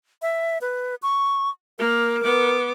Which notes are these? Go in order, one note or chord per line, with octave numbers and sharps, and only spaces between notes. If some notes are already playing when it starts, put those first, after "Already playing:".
E5
B4
C#6
A#3 A#4
B3 D6